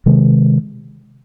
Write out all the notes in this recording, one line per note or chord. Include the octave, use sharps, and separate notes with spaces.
C3 D#3 G#3